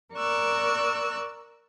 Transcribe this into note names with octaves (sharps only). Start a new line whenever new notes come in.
A#4 D5 C#6 E6 F#6